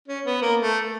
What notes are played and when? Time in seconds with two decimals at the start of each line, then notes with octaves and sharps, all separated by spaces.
0.08 C#4
0.25 B3
0.42 A#3
0.60 A3